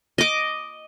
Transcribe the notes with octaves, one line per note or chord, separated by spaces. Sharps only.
D#5 D6